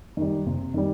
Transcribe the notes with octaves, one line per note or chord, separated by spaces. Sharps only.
D#3 G3
C3
D#3 G3